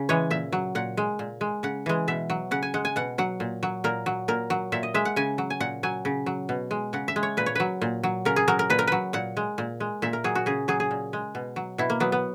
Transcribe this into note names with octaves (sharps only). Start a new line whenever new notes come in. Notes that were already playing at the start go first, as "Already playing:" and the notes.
Already playing: C#3
E3 G#3 C#5
A#2 E5
F#3
A#2 F#5
G#3
A#2
G#3
C#3 F#5
E3 G#3
B2 E5
F#3
C#3 F#5
G#5
G#3 F#5
G#5
B2 F#5
F#3 F#5
A#2
F#3
A#2 A#4
F#3
A#2 A#4
F#3
A#2 E5
D#5
G#3 E5
F#5
C#3 G#5
F#3
G#5
A#2 F#5
F#3 G#5
C#3
F#3
B2
G#3
C#3 F#5
E5
G#3
C#5
A#2 B4
C#5
F#3 B4
A#2
F#3
C#3 A#4
G#4
F#3 A#4
A#4
A#2 B4
A#4
F#3 B4
A#2 F#5
G#3
A#2
G#3
A#2 E5
A#4
F#3 G#4
F#4
C#3 G#4
F#3 G#4
G#4
A#2
G#3
B2
F#3
B2 E4
A#3
F#3 B3
B3